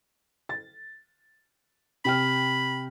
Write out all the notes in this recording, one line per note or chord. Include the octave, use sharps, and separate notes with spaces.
A6
C3 G5 B5 F6